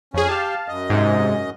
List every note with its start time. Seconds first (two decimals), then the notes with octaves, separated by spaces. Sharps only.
0.14 F2 C#4 G#4
0.29 G4 F5 A5
0.68 F#2 D#5
0.90 G#2 C3